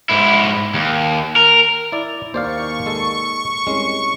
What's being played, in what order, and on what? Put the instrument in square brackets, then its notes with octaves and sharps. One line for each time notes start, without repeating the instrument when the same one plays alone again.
[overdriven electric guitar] G#2 E4
D#2
A#4
[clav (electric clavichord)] E4 D5
[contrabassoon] D#2 [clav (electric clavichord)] C5 D5 F5 [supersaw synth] C#6
[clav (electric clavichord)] G#3 A4
[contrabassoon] C2 [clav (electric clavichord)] G#3 C#4